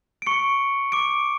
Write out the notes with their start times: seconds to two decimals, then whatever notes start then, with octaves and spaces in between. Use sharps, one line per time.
0.22 D7
0.27 C#6 C#7
0.92 D6 D7